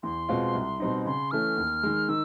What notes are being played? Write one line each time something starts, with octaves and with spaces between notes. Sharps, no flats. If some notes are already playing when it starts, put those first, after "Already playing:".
E2 C6
B2 G#3 C4 F4
C2
B2 G3 C4 D#4
C#3 C6
E3 A3 C#4 F6
D#2
D#3 G#3
D#3 E6